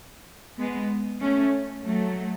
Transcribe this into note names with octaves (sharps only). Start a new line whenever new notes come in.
G#3 B3
A3 C#4
F#3 A3